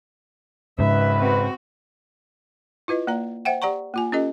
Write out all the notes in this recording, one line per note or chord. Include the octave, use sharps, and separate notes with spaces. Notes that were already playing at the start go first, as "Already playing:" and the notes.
G#1 G#2 C#3 B4 E5
C4 F#4
E4 F4 B4 D#5
A#3 D5 F5 A#5
C5 E5 F#5 G5
G4 D5 F#5 A#5 C#6
A#3 F4 G#5
C#4 F4 G4 A4 D#5